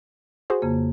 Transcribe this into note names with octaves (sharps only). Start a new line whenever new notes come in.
F#4 G#4 C5
F2 C#3 A#3